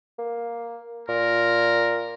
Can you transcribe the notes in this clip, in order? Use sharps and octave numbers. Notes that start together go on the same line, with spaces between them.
A#3
A#2 A#4